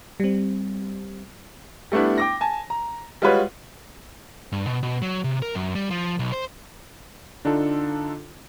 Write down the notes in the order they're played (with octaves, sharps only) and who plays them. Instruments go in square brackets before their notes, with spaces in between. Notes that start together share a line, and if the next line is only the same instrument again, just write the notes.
[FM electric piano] G3 C4
[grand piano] G3 A3 B3 D4 E4
G5 D6 A#6
G#5 A5
A#5
G3 G#3 F4 F#4 B4 C#5
[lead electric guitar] G2
B2
B2
F#3
C3
A#4
F#2
G3
F3
B1
C5
[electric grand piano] D3 D4 D#4 F4 A4